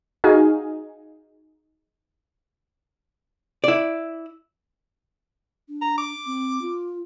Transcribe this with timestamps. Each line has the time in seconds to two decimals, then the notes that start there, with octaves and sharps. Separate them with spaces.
0.24 D#4 F#4 G#4 D#5 F5 G#5
3.64 E4 D5
5.68 D4
5.82 A#5
5.98 D6
6.26 C4
6.62 F4